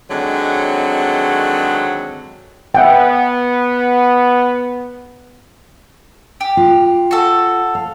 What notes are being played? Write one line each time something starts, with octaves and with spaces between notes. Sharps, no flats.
D3 D#3 F#3 G#3 C4
B3 E5 F#5 G5
G4
F4
F#4 A4
F5